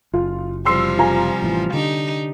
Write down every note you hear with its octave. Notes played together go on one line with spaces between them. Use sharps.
F#1 F4
C3 F3 G3 C6 E6 C7
F4 G#5 A#5
A1 E3
D3 D4 D#4 G4